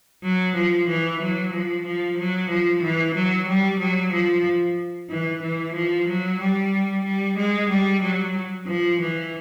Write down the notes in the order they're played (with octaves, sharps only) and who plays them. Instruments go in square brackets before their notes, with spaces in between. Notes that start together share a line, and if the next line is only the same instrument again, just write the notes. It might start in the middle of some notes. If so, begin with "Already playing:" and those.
[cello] F#3
F3
E3
F#3
F3
F3
F#3
F3
E3
F#3
G3
F#3
F3
E3
E3
F3
F#3
G3
G3
G#3
G3
F#3
F3
E3